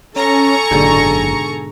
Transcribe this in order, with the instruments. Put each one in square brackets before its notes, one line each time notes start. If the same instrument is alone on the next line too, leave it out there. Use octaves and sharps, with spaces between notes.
[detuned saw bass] C#4 [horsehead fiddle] A4 G#5 [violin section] A#5 C#6
[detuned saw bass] F#1 [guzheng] G#2 B2 D3